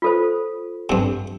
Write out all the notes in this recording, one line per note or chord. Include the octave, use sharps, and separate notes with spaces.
F4 A4 C5
G2 C3